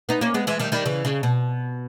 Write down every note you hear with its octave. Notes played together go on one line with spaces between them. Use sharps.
B3 D#4
A#3 C#4
G#3 B3
E3 G#3
D#3 G3
D#3 G3
C#3 E3
C#3
B2